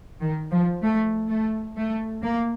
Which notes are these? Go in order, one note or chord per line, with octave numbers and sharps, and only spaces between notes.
D#3
F3
A3
A3
A3
A#3